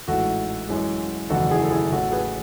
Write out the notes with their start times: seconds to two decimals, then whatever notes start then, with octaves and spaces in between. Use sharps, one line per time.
0.08 A1 G#2 E3 A3 F#4 A4
0.69 F#2 E3 G#3
1.30 F#1 E2 D#3 A3 F#4 A4
1.51 E4 G#4
1.63 A4
1.71 E4 G#4
1.92 A1 A2 E3 F#4 A4
2.12 G#4 B4